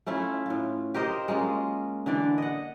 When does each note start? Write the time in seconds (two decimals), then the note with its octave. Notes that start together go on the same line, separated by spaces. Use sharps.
0.06 A3 C#4 E4 F4
0.46 A2 F4
0.94 G4 A#4 C5 D#5
1.28 G#3 A#3 C#4 F4
2.06 D3 E3 D4 D5
2.38 D#5 F#5